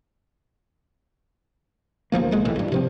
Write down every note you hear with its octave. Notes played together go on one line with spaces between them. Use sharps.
A1 D2 F3 A#3
B1 G#3 A#3
B1 A2 E3
A1 G2
C3 F3 C4